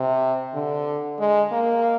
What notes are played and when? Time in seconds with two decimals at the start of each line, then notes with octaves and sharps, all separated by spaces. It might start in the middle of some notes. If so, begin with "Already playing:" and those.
Already playing: C3
0.54 D3
1.19 G#3
1.51 A#3